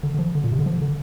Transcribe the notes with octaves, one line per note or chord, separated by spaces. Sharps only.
D3
D3
F3
D3
A#2
C3
D3
F3
D3